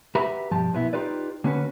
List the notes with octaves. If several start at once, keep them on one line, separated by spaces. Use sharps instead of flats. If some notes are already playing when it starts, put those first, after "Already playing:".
F#4 G4 B4 E5 A#5 B5
B1 G2 F3 G4 A5
B1 A#2 B3 E4
D#4 F4 G4 B4 D5
D3 A#3 C#4 F#4 G#4 B4